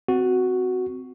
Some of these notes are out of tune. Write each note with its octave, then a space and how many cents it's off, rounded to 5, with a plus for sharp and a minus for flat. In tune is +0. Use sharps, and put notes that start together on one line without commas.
C4 -20 F#4 +0